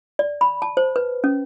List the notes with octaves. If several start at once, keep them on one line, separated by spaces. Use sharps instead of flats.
D5
B5
A5
C5
B4
C#4